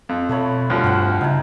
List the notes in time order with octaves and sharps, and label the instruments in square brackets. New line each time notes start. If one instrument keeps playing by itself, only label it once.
[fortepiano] F2
[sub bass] B2 [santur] A3 C#5 B5
[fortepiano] D2 F3 G3
[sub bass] G2 [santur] C4 F#5
[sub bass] C#3 [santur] D#4 E4